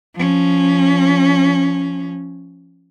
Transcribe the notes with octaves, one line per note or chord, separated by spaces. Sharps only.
F3 C#4